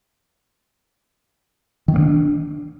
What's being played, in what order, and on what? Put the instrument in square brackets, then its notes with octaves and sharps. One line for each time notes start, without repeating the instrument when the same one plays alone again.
[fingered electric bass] D#3
A#3
D4